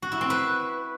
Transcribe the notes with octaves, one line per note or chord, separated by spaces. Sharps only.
F#4
E4
C4
B4